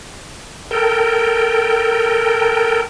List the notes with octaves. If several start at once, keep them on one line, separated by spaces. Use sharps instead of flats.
A4 A#4 G5